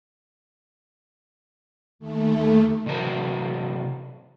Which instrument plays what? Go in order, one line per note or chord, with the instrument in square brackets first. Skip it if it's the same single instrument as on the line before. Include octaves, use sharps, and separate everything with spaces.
[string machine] D#2 A3
[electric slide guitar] C3 E3 F#3 A#4 C5